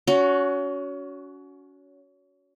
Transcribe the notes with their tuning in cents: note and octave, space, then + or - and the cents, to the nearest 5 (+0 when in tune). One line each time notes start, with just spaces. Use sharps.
C#4 +30 F#4 +0